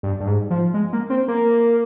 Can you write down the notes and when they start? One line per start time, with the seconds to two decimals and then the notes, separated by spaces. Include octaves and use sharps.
0.03 G2
0.20 G2
0.27 G#2
0.50 F3
0.74 G#3
0.93 A#3
1.10 C4
1.28 A#3